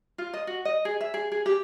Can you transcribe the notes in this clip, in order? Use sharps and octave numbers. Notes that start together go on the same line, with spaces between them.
F4
D#5
F#4
D#5
G#4
E5
G#4
G#4
G4